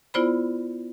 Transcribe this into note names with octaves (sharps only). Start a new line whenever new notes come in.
B3 E4 F4 C5 D5 B5